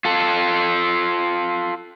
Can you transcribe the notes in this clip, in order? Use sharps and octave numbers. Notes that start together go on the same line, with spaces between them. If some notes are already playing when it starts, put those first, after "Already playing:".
F4 A4